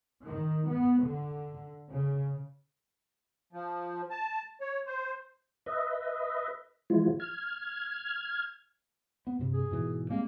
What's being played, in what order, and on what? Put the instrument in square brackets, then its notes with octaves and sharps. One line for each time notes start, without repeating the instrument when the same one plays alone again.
[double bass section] D#3
B3
D3
C#3
[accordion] F3
A5
C#5
C5
[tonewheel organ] B4 D#5 E5
E3 F3 G#3 E4 F4
F6 G#6
[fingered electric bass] B3
G2 C3
[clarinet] G#4
[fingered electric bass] G#2 B2 E3
[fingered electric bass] G3 G#3 C4 [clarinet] A#3